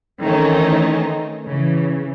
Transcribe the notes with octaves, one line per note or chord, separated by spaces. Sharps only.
D#3 E3 A3 C4 C#4 D#4
C#3 E3